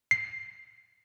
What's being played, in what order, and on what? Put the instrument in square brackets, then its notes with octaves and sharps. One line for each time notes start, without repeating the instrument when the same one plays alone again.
[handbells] C7